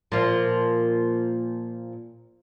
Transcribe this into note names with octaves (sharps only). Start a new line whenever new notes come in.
A#2 F3